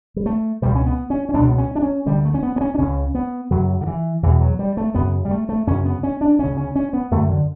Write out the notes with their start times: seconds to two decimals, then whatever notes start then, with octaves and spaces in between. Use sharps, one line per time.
0.16 G3
0.26 A3
0.62 C#2 B2 G3
0.75 C#4
0.86 B3
1.10 C#4
1.29 C#4
1.34 C#2 B2 D4
1.49 B3
1.58 C#4
1.75 D4
1.83 C#4
2.06 D2 D3 G3
2.25 A3
2.34 C#4
2.43 B3
2.56 B3
2.61 C#4
2.75 D4
2.78 C#2 C#3 C#4
3.15 B3
3.51 F#2 C#3 F#3
3.81 D3
3.87 E3
4.23 E2 B2 E3
4.41 F#3
4.59 G3
4.77 A3
4.95 F#2 C#3 B3
5.25 G3
5.31 A3
5.49 A3
5.67 F#2 C#3 C#4
5.85 B3
6.03 C#4
6.21 D4
6.39 D2 C#3 C#4
6.57 C#4
6.75 C#4
6.93 B3
7.11 F#2 D3 A3
7.30 D3